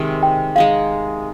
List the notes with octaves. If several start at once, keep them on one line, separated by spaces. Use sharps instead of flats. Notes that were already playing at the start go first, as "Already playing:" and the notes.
Already playing: C3 D#3 G#3
G5
G#3 D#4 G#4 F5